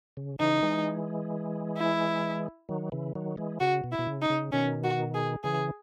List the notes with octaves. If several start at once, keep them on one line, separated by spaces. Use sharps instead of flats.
C#3
C#3 E3 D#4
E3 G#3
E4
D#3 F#3
C#3 E3
D#3 F#3
E3 G#3
C#3 F#4
B2
E4
B2
C#3
D#4
C#3
B2 D#3 C#4
F#4
G#4
C#3 E3 G#4